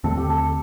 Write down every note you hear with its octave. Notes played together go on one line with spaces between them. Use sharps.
D#2 D3 A3 C4 A4
G4
A4